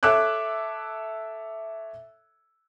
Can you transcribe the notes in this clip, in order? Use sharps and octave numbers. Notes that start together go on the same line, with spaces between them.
A4 C#5 E5 D6 F#6